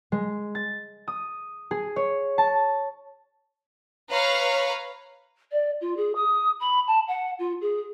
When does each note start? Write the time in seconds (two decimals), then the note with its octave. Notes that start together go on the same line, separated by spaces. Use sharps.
0.12 G#3
0.55 A6
1.08 D#6
1.71 G#4
1.96 C#5
2.38 A5
4.09 B4 C#5 F5 A#5
5.51 D5
5.80 F4
5.96 G#4
6.15 D#6
6.60 B5
6.87 A5
7.07 F#5
7.39 F4
7.61 G#4